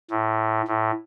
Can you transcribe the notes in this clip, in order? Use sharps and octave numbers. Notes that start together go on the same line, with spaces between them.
A2
A2